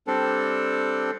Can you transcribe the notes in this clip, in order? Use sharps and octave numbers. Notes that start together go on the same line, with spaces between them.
G3 C4 D4 A4